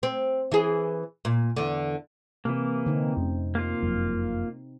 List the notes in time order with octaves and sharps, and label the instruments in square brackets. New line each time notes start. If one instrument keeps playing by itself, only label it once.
[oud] C4
E3 G#4
A#2
E2 D3
[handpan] C3 [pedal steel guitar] E3 A#3
[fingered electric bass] D3 [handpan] C4 D#4
[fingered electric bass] F2 A3 C#4
[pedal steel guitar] A#3 F4
[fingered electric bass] F#1 F2 F#3